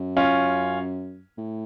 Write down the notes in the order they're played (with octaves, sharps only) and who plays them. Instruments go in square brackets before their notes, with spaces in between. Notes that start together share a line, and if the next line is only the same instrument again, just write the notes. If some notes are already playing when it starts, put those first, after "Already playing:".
Already playing: [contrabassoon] F#2
[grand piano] C#4 F4
[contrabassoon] A2